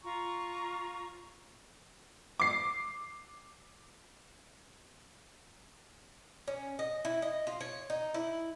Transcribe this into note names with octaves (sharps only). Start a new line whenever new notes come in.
F4 A#5 C#6
D6 C7
C#4
D#5
E4
D#5
F4
C#5
D#4
E4